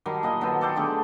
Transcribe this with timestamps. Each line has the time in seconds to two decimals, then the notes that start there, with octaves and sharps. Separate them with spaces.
0.06 D#3 F#3 G3 A5
0.23 A#2 D#5 G#5
0.41 F#3 B3 A4 C5
0.61 A4 D5 G5 C6
0.76 D3 A3 G4 G#4